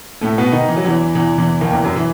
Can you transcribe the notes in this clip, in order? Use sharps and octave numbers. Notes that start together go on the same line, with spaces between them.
A2 A3
B2 B3
D#3 D#4
E3
F#3
E2 E3
E2 E3
E2 E3
D#2 D#3
E2 E3
F#2 F#3
E3